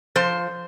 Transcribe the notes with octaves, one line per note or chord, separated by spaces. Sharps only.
F3 C5